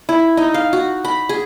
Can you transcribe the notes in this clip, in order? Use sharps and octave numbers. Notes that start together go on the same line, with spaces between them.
E4
D#4
F5
F#4
B5
G#4